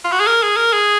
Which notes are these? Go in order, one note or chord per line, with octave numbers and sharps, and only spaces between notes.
F4
F#4
G#4
A#4
G#4
A#4
G#4